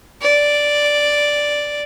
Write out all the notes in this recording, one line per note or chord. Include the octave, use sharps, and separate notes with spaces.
D5